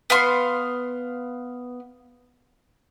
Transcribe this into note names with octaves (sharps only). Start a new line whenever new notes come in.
B3 F5 C6